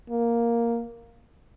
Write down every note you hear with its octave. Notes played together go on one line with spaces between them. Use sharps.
A#3